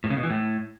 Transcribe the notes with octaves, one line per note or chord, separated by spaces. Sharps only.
A2
C#3
B2
E3
A2